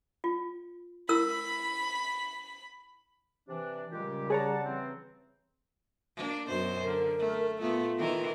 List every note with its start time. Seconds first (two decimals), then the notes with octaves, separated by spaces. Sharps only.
0.24 F4
1.09 E4 A#4 B5 E6
3.48 C3 E3 D4
3.92 A#2 C#3 G3 G#3 G4
4.30 G#4 C#5 D5 F#5 A5 A#5
4.65 E3 C4
6.16 A#3 D4
6.47 F#2 B2 C5
6.84 D3 A#4
7.19 A3
7.61 A#2 A3 B3 F4
7.97 D#3 E3 A#4